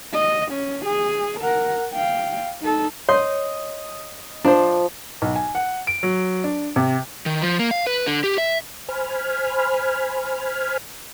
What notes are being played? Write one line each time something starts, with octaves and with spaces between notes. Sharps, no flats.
D#5
C#4
G#4
A#4 F#5
F5 G5
D#4 A4
C#5 D#5 C6
F3 D4 C5
B1
G#5
F#5
D7
F#3
D4
C3
D#3
F3
A#3
F5
B4
D3
G4
E5
C5 G#5 B5 F6